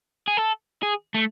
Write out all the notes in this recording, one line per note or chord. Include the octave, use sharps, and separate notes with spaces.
G#4
A4
G#4
A3